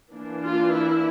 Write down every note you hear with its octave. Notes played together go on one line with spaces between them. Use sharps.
E3 A#3 D4
F4
E4